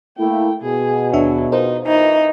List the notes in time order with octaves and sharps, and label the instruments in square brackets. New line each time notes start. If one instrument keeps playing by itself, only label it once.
[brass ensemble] A3 A#3 E4 [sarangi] G5
[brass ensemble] B2 [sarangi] G#4
[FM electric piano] D#2 D4 E5 [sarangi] F#3
[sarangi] D#4 [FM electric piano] F4 A#4 C5
[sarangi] E3 [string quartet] D#4